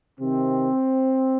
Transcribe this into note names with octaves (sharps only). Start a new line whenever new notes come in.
C3 D#3 C4